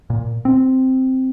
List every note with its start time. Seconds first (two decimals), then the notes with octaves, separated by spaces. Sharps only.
0.10 A#2
0.45 C4